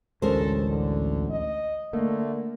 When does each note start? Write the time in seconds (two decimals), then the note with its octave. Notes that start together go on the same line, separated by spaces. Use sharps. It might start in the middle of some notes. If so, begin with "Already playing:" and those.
0.22 A1 D2 G#3 C#4 A4 A#4 C5
0.70 D3
1.30 D#5
1.93 D3 A3 A#3